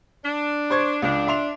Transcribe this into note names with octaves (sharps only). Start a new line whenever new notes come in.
D4
C5 C#6 G#6
C#2 D4
E5 C6 F7